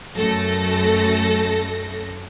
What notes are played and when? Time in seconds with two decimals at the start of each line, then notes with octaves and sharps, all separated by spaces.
0.15 F#2 A3 A4 A#6